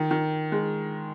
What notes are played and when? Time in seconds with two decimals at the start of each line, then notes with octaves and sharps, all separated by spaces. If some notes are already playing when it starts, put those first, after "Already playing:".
Already playing: D#3
0.11 D#3
0.52 G#3